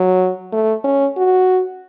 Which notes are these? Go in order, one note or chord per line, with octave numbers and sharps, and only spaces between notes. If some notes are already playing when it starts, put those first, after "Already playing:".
Already playing: F#3
A3
C#4
F#4